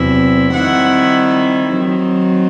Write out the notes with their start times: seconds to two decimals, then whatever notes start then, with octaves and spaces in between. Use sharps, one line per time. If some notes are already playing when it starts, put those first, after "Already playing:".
Already playing: E2 C3 F#3 C4 E4
0.54 D#3 G3 C4 E4 F#5
1.75 D#3 F#3 C4